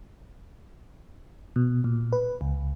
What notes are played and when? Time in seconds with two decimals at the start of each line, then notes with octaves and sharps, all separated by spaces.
1.56 B2
1.84 A#2
2.13 B4
2.41 C#2